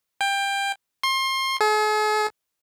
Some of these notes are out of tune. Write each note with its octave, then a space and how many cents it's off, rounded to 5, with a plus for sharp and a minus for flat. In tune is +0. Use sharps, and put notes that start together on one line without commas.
G5 +20
C6 +30
G#4 +45